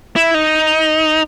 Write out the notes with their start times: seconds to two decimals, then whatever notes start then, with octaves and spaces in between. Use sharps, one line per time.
0.16 E4
0.34 D#4